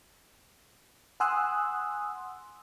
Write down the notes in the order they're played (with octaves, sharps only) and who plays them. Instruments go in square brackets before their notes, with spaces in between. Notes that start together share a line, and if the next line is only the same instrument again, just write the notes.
[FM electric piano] F#5 G#5 C6 D#6 E6 F#6